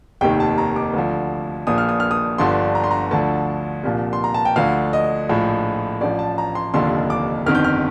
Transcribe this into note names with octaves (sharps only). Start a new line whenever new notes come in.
F1 D#2 D#3 G5
A5
A#5
D6
D2 D3 F3
A#1 A#2 F3 D#6
F6
D#6
F6
D#6
G1 G2 D3 F3 C6
A#5
C6
A#5
D2 D3 F3 A5
C2 A#2 F3
C6
A#5
A5
G5
D2 D3 F3 F5
D#5
A#1 A2 F3
A1 A2 F3 D5
A5
A#5
C6
F1 D#2 D3 F3 C6
D6
G1 F2 D#3 F6
G6
F6